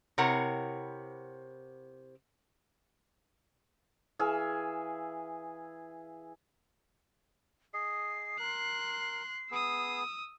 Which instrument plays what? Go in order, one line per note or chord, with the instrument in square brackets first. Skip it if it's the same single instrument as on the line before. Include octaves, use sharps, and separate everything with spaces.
[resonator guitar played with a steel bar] C3 C4 E4 A#4 C#5 F#5
[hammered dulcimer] E3 G#4 E5 F5
[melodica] G#4 D#5 [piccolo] C7
[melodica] A#4 [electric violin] C6 F#6
[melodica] B3 G#4 [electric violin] D#6 E6